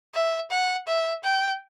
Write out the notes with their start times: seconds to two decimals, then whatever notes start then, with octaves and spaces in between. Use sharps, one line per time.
0.14 E5
0.50 F#5
0.87 E5
1.24 G5